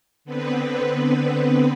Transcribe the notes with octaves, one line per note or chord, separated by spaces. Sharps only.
D3 B3 C4 B4